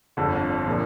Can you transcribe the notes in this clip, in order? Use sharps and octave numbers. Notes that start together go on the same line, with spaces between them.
G1 F2 D3
A#2 F3 A#3 D4